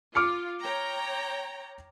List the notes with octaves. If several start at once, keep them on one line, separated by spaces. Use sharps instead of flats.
F4 D6 F6 C#7
C#5 G5 A#5